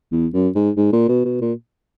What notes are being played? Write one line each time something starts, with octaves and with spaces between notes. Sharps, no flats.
E2
F#2
G#2
G#2
A#2
B2
B2
A#2